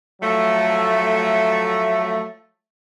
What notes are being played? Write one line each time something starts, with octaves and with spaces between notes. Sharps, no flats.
F3 F#3 A3